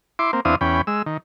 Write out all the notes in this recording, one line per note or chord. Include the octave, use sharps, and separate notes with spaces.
E4 C6 D6
A#3 C4
E2 C4 D4 E4 F5 D#6
E2 C#4 G5 B5
G#3 E6
D#3